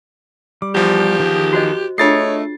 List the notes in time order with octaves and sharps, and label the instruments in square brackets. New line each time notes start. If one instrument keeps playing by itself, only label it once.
[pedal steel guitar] G3 [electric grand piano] D6
[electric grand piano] E2 F3 [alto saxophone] G4
[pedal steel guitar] D#3 G#4
[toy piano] F#4 C5 D#5
[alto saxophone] A3 [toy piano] D4 F4 G#4 [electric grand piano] C#5 A6 C7 [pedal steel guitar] D#5